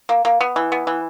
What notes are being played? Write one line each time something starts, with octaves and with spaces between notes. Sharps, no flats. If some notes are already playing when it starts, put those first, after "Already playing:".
A#3
A#3
B3
E3
B3
E3